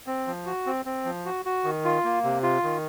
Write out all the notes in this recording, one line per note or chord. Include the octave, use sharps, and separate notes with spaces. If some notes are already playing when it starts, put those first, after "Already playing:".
C4
F3
F#4
C4
C4
F3
F#4
F#4
D#3
F4
A#3
C3
F4
D#3